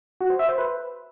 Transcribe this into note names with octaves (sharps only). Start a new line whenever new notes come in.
F#4
C5
E5
C5
B4